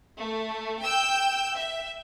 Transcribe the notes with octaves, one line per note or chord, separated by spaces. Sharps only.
A3
G5 E6 G6
E5